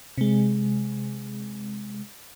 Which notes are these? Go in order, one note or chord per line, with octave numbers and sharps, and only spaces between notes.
C3 G#3